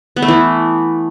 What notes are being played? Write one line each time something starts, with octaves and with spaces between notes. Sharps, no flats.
B3
A3
E3